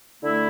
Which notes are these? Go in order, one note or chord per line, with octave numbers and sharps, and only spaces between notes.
D3 A3 E4